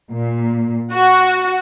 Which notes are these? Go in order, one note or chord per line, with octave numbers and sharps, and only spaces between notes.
A#2
F#4